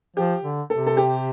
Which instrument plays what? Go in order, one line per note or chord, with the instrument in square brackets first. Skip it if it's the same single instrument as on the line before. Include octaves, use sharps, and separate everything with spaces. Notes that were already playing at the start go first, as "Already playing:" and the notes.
[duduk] F3 [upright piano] G4
[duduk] D3
[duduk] C3 [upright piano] A4
[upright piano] A4
G4